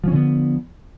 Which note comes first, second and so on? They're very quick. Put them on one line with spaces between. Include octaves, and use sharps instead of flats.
F3 C#4 D3 B3